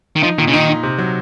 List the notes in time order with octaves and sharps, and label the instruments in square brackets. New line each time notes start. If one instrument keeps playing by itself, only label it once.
[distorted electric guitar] D#3
[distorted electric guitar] F3 [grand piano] D#4
[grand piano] A#2 [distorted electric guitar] D#3
[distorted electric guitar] C#3
[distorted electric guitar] D#3 [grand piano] D#4
[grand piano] D#4
C3
F#3